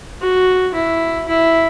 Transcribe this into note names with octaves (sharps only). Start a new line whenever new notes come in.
F#4
E4
E4